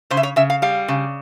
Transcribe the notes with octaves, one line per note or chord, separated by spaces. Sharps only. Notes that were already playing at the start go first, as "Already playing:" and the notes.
C#3 C5
E5
C#5
C#3 E5
F5
G3 F5
C#3